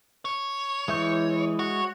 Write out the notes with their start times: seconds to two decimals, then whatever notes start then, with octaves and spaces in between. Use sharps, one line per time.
0.25 C#5
0.88 E3 G#3 E5 G6
1.59 F#4 C#5